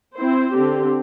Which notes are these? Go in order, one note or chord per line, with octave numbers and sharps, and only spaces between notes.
C4 E4 C5
D3 C4 G4